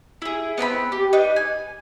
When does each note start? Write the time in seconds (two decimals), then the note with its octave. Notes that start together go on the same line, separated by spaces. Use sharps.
0.22 E4 G#4
0.58 B3 C4 A#5 B5
0.92 G4
1.13 D4 D#4 B4
1.36 G#5